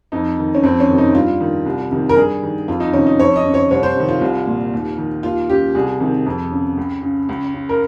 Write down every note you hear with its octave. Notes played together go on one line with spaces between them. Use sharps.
F2 D#4
D#3
C#4
F2 C4
C#4
C3 D#3
D#4
G2 F4
D#3
C2
C3 D#3
A#4
G2 G#4
D#3
F2 F4
D#4
C3 D#3 C#4
D#4
F2 C#5
D#5
C#3
C#5
C2 C#5
C5
C3 D#3
F4
C2
A#2
D#2
D#3
D#2 F4
C#3 G4
C2 G#4
C3 D#3
F2
C#3
C#2
C#3
C#2
C#3
A#4